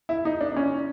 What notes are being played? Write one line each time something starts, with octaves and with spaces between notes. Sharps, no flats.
E4
D#4
D4
D4
C#4